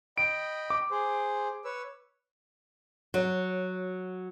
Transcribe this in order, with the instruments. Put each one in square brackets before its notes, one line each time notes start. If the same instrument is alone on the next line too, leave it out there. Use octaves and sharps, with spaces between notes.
[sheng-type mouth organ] D#5 G5 B5 [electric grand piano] D7
[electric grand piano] D6
[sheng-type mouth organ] G#4 C5
B4 C#5 E6
[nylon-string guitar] F#3